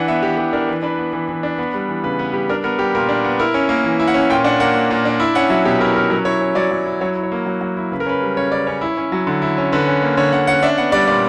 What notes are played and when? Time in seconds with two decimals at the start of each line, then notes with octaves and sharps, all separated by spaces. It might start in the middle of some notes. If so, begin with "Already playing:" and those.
Already playing: E3 D4 F#5
0.08 B3 E5
0.23 E3 G4
0.37 E3 G4
0.53 D4 A#4
0.68 E3 B4
0.83 D4 B4
0.98 B3
1.13 E3 B4
1.29 E3
1.43 D4
1.58 B3 B4
1.74 G3
1.88 E3
2.04 C#3 B4
2.19 B3 B4
2.33 G3 G4
2.49 D4 A#4
2.64 B3 A#4
2.79 G3 G4
2.95 A#2 A#4
3.09 D4
3.25 B3
3.39 E4 A#4
3.54 C#4
3.69 A#3
3.84 E3
3.99 E4
4.08 F#5
4.14 C#4
4.30 A#2 G5
4.44 D4 F#5
4.60 A#3 F#5
4.75 A#2
4.91 A#2
5.05 D4
5.20 E4 E5
5.35 C#4 F#5
5.50 F#3 E5
5.65 B2 G4
5.80 E4 A#4
5.96 C#4 A#4
6.10 F#3 A#4
6.25 E4 C#5
6.41 C#4
6.55 F#3 D5
6.71 F#3
6.86 E4
7.01 F#3 C#5
7.17 E4
7.23 C#5
7.32 A#3
7.46 F#3
7.61 F#3
7.77 E4
7.92 C#3 B4
8.00 A#4
8.06 C#4 B4
8.22 G3
8.37 C#3 C#5
8.51 C#3 D5
8.67 C#4 C#5
8.81 E4
8.97 C#4
9.12 F#3
9.27 D3
9.42 E4
9.58 C#4
9.72 D3 B4
9.87 C#4
10.02 A#3
10.17 D3 C#5
10.32 D3 F#5
10.47 C#4 F#5
10.63 D4 E5
10.78 B3 F#5
10.92 G3 D5
11.08 A#2 D5